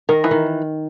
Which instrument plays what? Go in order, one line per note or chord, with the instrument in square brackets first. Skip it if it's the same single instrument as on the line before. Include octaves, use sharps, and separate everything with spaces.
[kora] D#3 [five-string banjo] A#4
[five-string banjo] E3
[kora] D#3